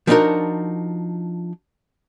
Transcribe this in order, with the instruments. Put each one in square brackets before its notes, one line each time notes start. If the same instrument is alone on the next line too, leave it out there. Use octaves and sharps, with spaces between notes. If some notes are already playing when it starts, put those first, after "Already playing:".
[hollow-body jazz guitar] F3 B3 D4 D#4 F#4 A#4